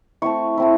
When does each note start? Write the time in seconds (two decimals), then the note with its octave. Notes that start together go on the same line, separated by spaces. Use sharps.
0.22 A3 C4 E4 C#6
0.57 A3 C4 E4